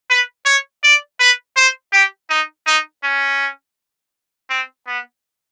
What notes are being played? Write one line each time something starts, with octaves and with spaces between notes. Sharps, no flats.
B4
C#5
D5
B4
C5
G4
D#4
D#4
C#4
C4
B3